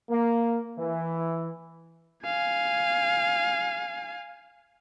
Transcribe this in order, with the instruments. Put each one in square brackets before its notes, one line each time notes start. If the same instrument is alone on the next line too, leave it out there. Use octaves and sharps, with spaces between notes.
[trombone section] A#3
E3
[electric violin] F5 G#5